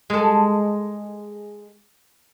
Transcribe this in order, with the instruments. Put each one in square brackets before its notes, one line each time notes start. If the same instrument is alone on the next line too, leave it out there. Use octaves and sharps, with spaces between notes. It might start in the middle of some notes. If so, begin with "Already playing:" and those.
[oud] G#3 A4